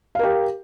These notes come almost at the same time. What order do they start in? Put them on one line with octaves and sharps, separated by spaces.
F5 A#4 G4